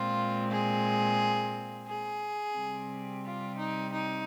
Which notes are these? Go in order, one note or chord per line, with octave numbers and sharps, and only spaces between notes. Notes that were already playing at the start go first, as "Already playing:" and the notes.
Already playing: A#2 G#3 C4 F4
G#4
G#4
C3 G3 C4
F4
D#4
D#4